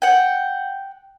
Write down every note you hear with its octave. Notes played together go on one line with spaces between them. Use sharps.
F#5 G5